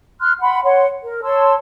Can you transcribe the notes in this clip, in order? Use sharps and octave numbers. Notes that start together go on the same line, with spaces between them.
C6 F6 F#6
F#5 B5 C6
C#5 F#5 C6
A#4
C#5 A5 C6 E6